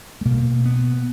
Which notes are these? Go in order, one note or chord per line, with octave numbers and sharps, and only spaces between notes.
A3
B2 A#3
B3